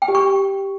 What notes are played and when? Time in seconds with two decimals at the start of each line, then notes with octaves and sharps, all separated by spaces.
0.02 G5
0.08 G4
0.15 C#6